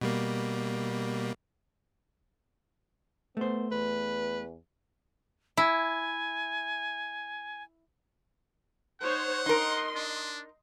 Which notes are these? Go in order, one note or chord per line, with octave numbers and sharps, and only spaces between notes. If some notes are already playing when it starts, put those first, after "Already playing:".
B2 G3 A#3
A3 B3 C5
E2 B4
E4 G#5
D#4 C5 C#5 F#5
D#4 A#4 D#5 C6
D4